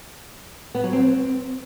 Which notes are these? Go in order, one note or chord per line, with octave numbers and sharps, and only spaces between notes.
B3
F#3
C4